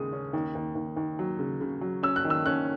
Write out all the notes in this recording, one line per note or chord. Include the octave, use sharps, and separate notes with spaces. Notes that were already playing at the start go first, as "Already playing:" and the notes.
Already playing: D#2 C#3 G#3 D#6
C#4
D#2
D#2
D#2
D#2
F#3
C#3
C#3
F#3
C#4 E6
F#6
D#3
E6
C#4 F#6